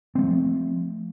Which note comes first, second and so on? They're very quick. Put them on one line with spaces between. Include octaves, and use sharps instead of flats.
C4 G3 A3 F3